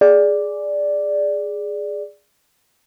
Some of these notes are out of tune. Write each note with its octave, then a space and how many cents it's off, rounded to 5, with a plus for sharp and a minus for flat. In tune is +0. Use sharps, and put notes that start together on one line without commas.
G#4 +0 D5 +0